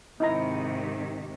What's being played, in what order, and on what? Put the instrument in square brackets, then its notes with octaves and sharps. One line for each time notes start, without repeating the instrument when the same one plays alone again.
[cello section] G#2 C3 D#3 [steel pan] D#4 E4 A#5